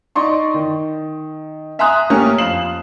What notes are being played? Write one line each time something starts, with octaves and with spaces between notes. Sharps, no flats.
D#4 D5 C6 C#6
D#3
E5 G#5 A#5 C6 D#6 F#6
A3 A#3 C#4 G4 A#4
F2 F4 C7 E7 F#7